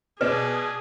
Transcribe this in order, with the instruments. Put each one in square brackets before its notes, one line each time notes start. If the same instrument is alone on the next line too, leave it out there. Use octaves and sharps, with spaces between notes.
[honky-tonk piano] B2 [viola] G#4 [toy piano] B4 [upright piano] D5